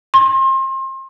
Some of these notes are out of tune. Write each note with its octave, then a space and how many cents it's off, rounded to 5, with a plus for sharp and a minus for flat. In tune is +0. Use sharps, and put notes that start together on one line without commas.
C6 +35